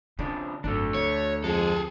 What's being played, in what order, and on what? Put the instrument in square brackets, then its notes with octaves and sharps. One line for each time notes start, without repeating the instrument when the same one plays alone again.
[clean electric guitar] F2 D4 [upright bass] C#3
[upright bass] G#1 F#2 [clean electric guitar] A3 D4
[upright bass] D2 [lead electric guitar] C#5
[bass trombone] F2 [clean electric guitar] G#3 [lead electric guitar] G#4 A4